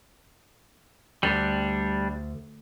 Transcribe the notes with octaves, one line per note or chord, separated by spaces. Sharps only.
D2 G3 D4